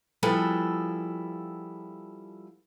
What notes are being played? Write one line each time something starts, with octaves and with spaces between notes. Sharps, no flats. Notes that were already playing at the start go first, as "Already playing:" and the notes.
F3 G3 B3 E4 G#4 A4